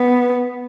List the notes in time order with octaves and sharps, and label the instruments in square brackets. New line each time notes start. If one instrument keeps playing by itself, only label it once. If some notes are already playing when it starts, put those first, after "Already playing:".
Already playing: [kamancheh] B3